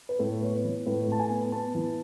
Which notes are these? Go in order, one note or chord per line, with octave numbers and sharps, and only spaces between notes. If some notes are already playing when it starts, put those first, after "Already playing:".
B4
A2 A4
B3 C#5
B4
E3
A2 B4
A2 A5
G#5
B3
B3 A5
E3